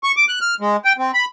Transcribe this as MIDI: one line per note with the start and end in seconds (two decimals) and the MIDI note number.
0.04 0.12 85
0.17 0.25 86
0.29 0.39 90
0.41 0.55 89
0.60 0.77 56
0.85 0.93 79
0.98 1.11 60
1.14 1.25 83